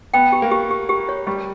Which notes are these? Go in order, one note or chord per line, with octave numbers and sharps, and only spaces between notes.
B3 G5
G4
A#3
G4
G4
G4
C#5
G3 G4